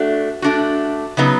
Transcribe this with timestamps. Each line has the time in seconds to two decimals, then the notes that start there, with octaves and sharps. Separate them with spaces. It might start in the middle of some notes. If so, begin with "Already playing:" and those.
Already playing: A3 D4 F#4
0.42 A3 D4 F#4
1.17 C#3 F#3 B3 D#4